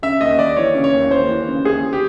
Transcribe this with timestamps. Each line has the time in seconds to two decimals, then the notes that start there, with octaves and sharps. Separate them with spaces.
0.03 C#3 E5
0.21 D#2 D#5
0.39 D#2 D5
0.56 E3 C#5
0.75 C#3
0.84 C#5
0.93 D#2
1.11 D#2 C5
1.29 E3
1.48 C#3
1.65 D#2 G#4
1.93 G4